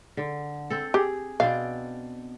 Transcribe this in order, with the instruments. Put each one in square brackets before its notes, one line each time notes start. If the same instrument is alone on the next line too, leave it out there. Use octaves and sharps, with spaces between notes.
[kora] D3
C4 A4
[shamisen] G4 [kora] G#4
[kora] B2 C4 D4 [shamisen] F5